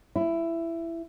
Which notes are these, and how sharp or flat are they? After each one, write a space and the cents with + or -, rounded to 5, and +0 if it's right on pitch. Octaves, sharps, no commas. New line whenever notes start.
E4 +15